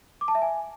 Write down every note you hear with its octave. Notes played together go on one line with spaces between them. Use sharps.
D6
A5
E5
G#5